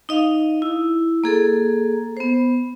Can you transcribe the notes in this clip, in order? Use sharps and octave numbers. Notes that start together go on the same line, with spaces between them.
D#4 D#5 F5
E4
A#3 G#4 A4
B3 C5